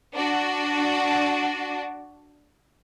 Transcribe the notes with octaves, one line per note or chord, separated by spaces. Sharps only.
D4 F#4